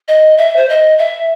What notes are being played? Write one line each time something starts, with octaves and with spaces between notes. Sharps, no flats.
D#5
E5
C5
D#5
E5